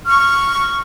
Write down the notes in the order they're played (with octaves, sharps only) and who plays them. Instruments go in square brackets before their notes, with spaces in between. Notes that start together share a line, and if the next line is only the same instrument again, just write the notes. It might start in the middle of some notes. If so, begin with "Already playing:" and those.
[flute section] C#6 [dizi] F6